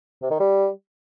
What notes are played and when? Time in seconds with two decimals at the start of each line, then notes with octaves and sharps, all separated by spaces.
0.22 C3
0.31 D#3
0.39 G3